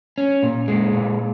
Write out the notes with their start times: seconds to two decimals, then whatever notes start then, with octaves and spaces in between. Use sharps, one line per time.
0.18 C#4
0.43 A#2
0.68 G#3
0.93 A#2